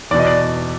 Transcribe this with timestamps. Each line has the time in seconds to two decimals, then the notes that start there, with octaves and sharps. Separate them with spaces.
0.11 E2 D5
0.14 B2
0.19 D#5
0.27 D5